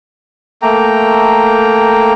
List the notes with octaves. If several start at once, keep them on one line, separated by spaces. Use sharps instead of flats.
A3 A#3 G5 A#5